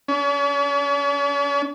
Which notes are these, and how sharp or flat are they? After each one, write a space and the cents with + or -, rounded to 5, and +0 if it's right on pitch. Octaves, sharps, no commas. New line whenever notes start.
C#4 +45